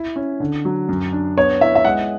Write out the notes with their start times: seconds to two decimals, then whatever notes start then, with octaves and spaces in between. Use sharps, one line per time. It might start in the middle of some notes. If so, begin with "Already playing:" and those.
Already playing: E4
0.16 C#4
0.40 D3
0.65 F#3
0.89 F#2
1.13 D4
1.37 B3 C#5
1.61 E4 E5
1.75 E5
1.85 G#3 F#5